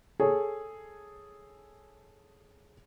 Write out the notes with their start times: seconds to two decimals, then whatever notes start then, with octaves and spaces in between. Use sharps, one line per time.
0.20 G#4 A4 C#5